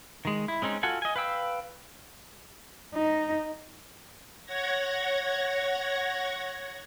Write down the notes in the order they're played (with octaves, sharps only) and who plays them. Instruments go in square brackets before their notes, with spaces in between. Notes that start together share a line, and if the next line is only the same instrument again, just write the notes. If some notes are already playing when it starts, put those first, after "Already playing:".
[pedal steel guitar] D#3 G#3
E4
G#3 C4 C#4 D#4
F4 F#4 A4 F#5 G#5
D#5 G#5
B4 F5 G5 E6
[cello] D#4
[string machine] C#5 F#5 G#6 A#6